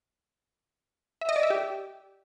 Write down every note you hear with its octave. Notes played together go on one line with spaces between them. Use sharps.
E5
D#5
D5
E5
G4